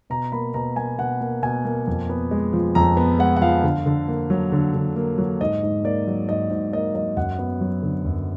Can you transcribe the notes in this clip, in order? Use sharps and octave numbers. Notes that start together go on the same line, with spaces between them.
B2 A#5
A#3 B5
B2 A#5
A#3 G#5
B2 F#5
A#3
B2 G#5
A#3
F2
B3
G#3
F3
F2 A#5
B3
G#3 F#5
F#5
F3 F5
D3
D3
A#3
F#3
D3
D3
A#3
F#3
G#2 D#5
G#2
A#3 D5
F#3
G#2 D#5
G#2
A#3 D#5
F#3 D#5
F#2 F#5
B3
F#3
D3
F#2